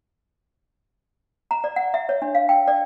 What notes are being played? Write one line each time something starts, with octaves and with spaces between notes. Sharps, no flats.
A#5
D5
F#5
E5
C#5
D4
F5
G5
D5